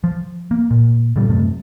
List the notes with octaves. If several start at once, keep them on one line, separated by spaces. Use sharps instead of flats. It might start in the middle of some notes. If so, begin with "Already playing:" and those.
F3
A#3
A#2
A2 C#3 G3
F#2 C3 A3